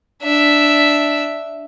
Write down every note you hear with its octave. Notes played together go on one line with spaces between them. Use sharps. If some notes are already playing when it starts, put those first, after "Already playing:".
D4 E5